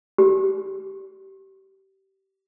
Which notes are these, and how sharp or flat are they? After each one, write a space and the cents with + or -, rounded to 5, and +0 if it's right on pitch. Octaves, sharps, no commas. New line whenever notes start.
G4 -25